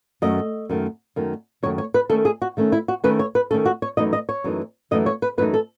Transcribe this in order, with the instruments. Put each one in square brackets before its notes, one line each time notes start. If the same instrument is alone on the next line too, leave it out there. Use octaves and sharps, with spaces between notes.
[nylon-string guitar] F#2 D#3 A3 D#5
F#2 D#3 A3
F#2 D#3 A3
F#2 D#3 A3 C#5
C#5
B4
D#3 A3 C#4 A4
G#4
F#4
D#3 A3 C#4
E4
F#4
D#3 A3 C#4 B4
C#5
B4
D#3 A3 C#4 A4
F#4
C#5
F#2 E3 A3 D#4 D#5
D#5
C#5
F#2 E3 A3 D#4
F#2 E3 A3 D#4 D#5
C#5
B4
F#2 E3 A3 D#4 B4
A4